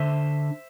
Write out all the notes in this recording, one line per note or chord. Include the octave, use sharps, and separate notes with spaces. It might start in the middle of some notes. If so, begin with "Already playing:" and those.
Already playing: D3 C5 E5